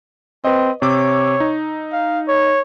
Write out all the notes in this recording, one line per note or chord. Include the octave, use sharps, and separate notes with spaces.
C4 B4 D#5
C3 C#5 D6 E6
D#4
F5
C#5